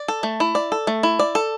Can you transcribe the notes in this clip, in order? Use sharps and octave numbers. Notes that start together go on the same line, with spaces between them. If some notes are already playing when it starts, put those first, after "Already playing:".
Already playing: D5
A4
A3
E4
D5
A4
A3
E4
D5
A4